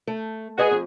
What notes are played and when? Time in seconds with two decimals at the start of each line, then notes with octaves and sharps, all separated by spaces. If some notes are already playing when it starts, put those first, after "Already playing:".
0.07 A3
0.58 F#4 G#4 B4 D#5
0.71 F2